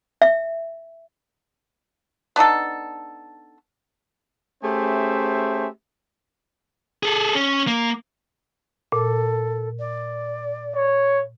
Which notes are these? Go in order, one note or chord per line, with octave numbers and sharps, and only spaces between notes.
E5
B3 D4 D#4 A4
A3 C#4 G4 G#4 C5 E5
G#4 A4
C#4
A#3
A#2 A4
D5
C#5